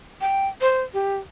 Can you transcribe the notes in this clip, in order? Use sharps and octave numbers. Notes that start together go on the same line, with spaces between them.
G5
C5
G4